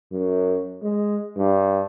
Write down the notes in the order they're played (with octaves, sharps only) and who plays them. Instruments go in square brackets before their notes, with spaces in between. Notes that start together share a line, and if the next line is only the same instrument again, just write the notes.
[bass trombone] F#2
G#3
G2